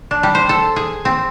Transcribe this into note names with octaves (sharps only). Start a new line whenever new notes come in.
D4
G3
C5
A4
G#4
C4